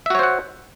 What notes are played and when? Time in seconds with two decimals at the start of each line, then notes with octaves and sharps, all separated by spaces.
0.06 E5
0.10 F#4
0.15 C#5
0.19 C5
0.23 F#5